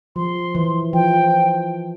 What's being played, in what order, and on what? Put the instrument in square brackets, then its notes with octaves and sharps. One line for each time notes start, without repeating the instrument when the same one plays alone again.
[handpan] F3 [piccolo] C6
[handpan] E3
[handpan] F3 [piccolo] G5